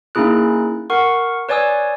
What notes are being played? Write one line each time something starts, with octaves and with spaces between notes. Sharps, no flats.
A#3 C#4 D#4 E4 G#4 F#6
A#4 F#5 C#6
B4 C#5 D5 G#5 D#6 E6